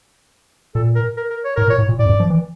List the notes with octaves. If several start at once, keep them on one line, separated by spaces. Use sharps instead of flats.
A#2 A4
A#4
A#4
A#4
C#5
A2 A#4
A#2 C#5
A2
A#2
A2 D5
F2
G2
F3
E3